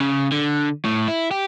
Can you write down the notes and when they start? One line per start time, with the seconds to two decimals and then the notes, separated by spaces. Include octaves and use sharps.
0.01 C#3
0.32 D3
0.85 A2
1.08 E4
1.31 G4